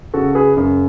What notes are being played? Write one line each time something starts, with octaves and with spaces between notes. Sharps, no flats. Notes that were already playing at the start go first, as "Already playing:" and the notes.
C#3 F#4 A4
G#4 B4
F#2